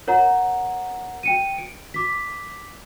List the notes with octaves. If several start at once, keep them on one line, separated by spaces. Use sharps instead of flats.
A#4 C#5 F#5 A#5
G5 C#7 D#7
D7
D6 B6